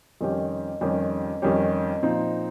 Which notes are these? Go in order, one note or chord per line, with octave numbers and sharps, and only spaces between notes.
F2 D#3 G3 C#4 G4
F2 D#3 G3 C#4 G4
F2 D#3 G3 C#4 G4
A#2 F3 C4 D#4